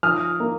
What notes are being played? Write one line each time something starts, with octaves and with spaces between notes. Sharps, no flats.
F3 D#6 F6
A#3